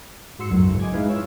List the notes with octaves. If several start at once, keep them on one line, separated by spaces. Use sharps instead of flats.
G#2 F#4 C6 E6 C#7
B1 F#2 A2 F#3
G#2 C#3
D#5 G#5 D6 G#6
G#3 D#4 E4 B4 F5
F4 C#5 E6